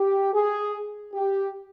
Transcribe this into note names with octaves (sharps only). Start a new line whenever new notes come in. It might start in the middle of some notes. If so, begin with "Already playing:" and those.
Already playing: G4
G#4
G4